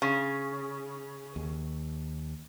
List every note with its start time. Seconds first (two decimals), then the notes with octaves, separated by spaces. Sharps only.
0.02 C#3
1.36 D#2